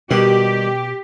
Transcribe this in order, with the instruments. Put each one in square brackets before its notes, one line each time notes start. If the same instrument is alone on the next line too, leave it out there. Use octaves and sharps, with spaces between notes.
[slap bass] B2 [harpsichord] D#3 G3 F#4 [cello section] G4